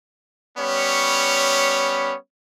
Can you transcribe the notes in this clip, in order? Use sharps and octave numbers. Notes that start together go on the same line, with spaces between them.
G3 B3 C#4 C#5 B5